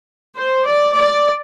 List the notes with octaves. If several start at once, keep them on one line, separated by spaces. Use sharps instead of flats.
C5
D5
D5